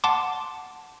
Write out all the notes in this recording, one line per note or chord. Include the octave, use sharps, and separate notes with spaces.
F#5 A5 C6 D6